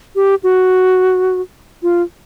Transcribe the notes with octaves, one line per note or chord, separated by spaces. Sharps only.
G4
F#4
F4